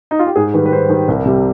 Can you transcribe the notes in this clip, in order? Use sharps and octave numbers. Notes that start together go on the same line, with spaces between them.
D#4
F4
G4
G#2 G#4
D#3 G3 B4
B4
G#2 C5
D#3 G3
C2
C3 G3